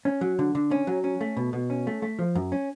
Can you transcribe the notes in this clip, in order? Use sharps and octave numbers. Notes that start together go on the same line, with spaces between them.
C#4
F#3
D3
D3
C#4
F#3
C#4
A3
B2
B2
C#4
A3
A3
F3
F#2
C#4